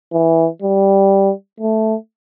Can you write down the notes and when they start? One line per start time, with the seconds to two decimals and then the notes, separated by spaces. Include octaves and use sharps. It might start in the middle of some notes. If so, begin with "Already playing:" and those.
0.13 E3
0.62 G3
1.60 A3